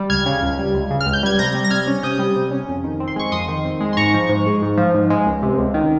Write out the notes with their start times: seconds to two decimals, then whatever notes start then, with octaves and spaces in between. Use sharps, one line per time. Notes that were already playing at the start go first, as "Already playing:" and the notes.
Already playing: G3
0.09 C#2 F6 G#6
0.26 C#3
0.42 C#2
0.59 G3
0.74 C#2
0.90 C#3
1.01 F6
1.06 C#2
1.13 G6
1.23 G3 G#6
1.39 C3 G6 A#6
1.55 G3
1.64 A#6
1.70 C3 F6 G#6
1.87 C#4
2.03 C3 D#6 G6
2.19 G3
2.36 C3
2.51 C#4
2.69 F2
2.84 D#3
3.00 C4
3.08 C6
3.16 G#3 C#6
3.32 F2 C6 D#6
3.48 D#3
3.65 C4
3.81 G#3
3.93 C6
3.97 G#2 A#5 C#6
4.14 F3
4.29 G#2
4.46 G#3
4.62 G#2
4.77 F3
4.94 G#2
5.10 G#3
5.26 C#2
5.43 C3
5.58 C#2
5.74 D#3